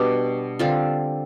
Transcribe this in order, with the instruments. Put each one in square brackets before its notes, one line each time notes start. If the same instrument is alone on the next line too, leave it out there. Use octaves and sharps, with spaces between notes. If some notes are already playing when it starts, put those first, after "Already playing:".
Already playing: [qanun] B2 G3 D4 G4
D3 G3 C4 F4